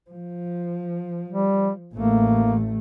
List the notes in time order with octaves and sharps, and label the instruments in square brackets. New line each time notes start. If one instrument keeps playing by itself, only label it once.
[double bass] F3
[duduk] G3
[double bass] A1 A3 [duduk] A#3